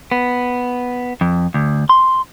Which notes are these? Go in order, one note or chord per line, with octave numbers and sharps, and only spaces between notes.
B3
F2
D2
C6